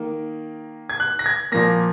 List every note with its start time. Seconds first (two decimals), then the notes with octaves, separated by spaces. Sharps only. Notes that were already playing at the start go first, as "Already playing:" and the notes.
Already playing: D#3 A#3
0.90 G#6
1.00 F#6
1.19 A#6
1.26 G#6
1.52 A#2 F3 A#3 A#6